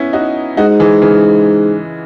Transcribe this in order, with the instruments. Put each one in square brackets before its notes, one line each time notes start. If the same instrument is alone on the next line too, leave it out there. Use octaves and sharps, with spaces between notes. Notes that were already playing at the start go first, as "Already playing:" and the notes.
Already playing: [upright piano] B3 C#4 E4
D#4 F#4
[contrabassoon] G#2 [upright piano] D#4 F#4
[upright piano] E3 G#3
C#3 E3